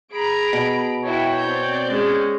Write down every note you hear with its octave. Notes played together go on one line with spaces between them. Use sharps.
G#4 A#5 B5 D7
B2
E4 F#4 C#5 G5
C4 D5 G6
G#3 C#4